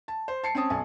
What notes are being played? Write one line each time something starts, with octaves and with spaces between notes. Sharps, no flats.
A5
C5
A5 C7 C#7
C4 C#4 A5 D#6
B1 G#5 A5